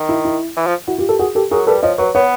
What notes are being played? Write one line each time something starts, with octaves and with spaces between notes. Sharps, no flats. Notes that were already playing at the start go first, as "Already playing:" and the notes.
Already playing: D#3
E4
E4
E3
F3
E4 F#4
F4 G4
G4 A4
F#4 G#4
G4 A4
F#3 G#4 A#4
G3 A4 B4
F3 C#5 D#5
F#3 B4 C#5
B3 B4 C#5